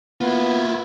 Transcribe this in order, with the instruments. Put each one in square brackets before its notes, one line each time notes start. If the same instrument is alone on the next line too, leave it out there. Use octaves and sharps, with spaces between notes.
[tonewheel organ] A#3 [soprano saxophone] B3 [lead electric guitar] E4 F4